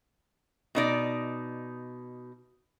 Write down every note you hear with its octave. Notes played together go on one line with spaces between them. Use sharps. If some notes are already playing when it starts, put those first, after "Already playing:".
B2 D#4 D5